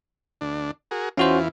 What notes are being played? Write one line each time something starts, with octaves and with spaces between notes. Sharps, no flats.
D2 D4
F#4 G#4 A#4
E2 E3 C#4 F4 F#4 C5